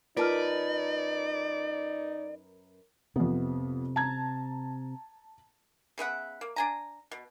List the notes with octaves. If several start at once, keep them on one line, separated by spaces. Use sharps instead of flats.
F#2 D#4 F4 A#4 B4 D5 A5 F6
F2 C3 B3
A5 A#5 G#6
C#3 B3 E5 F#5
A#3
D4 G#5 A#5
B2